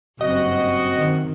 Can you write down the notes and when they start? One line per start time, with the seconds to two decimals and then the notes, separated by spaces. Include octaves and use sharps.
0.21 F#1 G2 C4 F#4 D#5
0.94 D#3